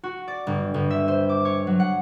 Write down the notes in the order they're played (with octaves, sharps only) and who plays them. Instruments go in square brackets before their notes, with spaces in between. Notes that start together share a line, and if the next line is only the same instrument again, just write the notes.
[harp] F#4
D5
G1
G1
E5
C5
D6
C#5
F#3
F#5